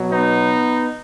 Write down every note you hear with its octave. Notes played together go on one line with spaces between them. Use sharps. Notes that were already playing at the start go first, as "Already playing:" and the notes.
Already playing: B2 F#3
B3 D#4